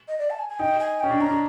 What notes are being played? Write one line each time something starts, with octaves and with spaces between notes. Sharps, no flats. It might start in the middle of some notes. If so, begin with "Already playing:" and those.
D#5
D5
A5
G#5
G#5
D#4 G5
G#5
C#4 G5
D4
C#4 A#5
D4